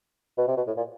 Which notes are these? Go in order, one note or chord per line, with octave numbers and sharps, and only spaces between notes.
B2
C3
B2
A2
A#2